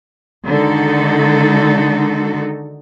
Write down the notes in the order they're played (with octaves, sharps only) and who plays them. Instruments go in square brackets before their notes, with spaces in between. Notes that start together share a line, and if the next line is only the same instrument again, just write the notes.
[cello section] D3 D#3 G#3 D#4 F#4 A4